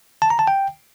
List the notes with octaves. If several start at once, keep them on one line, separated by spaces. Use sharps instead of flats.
A5
A#5
A5
G5